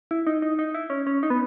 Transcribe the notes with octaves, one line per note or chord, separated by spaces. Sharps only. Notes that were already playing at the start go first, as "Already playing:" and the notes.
E4
D#4
D#4
D#4
E4
C#4
C#4
D#4
B3